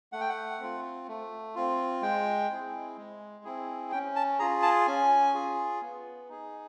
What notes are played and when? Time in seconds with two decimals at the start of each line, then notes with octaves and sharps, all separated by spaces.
0.12 A3 F#5
0.21 G5
0.29 F#5
0.60 C4 F4
1.08 A3
1.55 C4 F4
2.02 G#3 G5
2.50 C4 E4 G#4
2.97 G#3
3.44 C4 E4 G#4
3.92 C#4 G5
4.16 A5
4.39 F4 G#4 A#5
4.62 A5
4.87 C#4 G#5
5.34 F4 G#4
5.82 B3
6.29 D#4 G#4